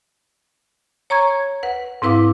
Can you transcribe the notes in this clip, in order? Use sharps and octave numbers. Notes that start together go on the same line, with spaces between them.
C#5 A#5 C#6 G#6
B4 F#5
G#2 C4 E4 B4 F5 D6